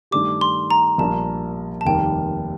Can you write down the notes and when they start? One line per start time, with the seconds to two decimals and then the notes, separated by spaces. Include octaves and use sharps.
0.11 G2 D#3 A3 D4 G4 D6
0.41 C6
0.70 A#5
0.98 A#1 A#2 G3 A#3 D4 A5
1.81 A5
1.85 F1 D#2 D#3 G3 A#3 G5